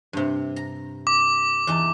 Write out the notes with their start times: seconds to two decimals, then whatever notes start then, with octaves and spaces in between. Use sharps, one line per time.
0.13 G2 C3
0.56 A#5
1.07 D6
1.67 E2 D#4 A5